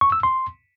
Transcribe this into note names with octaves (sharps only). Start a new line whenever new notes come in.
C#6
E6
C6